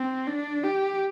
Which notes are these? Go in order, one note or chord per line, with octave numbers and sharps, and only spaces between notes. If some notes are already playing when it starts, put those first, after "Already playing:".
Already playing: C4
D4
G4